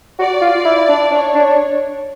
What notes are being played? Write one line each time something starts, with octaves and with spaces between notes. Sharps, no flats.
F#4 D5
F4
E4
D4
D4 C#5
D4